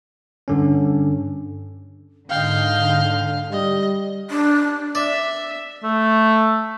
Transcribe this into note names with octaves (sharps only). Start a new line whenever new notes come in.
G2 D3 C#4
G#2 D3 D#5 F5 G5
G3 D#5
D4
D5 E5
A3